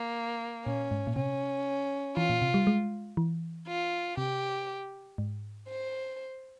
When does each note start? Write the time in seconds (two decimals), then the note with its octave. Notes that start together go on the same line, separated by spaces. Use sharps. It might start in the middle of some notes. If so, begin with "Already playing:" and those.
Already playing: A#3
0.65 A#2 C#4
0.91 G#2
1.07 A#2
1.16 C3 C#4
2.17 E3 F4
2.30 A#2
2.42 C3
2.54 G3
2.67 G#3
3.17 E3
3.67 F4
4.18 C3 G4
5.18 G#2
5.69 C5